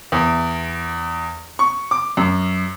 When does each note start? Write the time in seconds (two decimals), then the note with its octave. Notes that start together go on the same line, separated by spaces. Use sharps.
0.12 E2
1.59 C#6
1.91 D6
2.17 F#2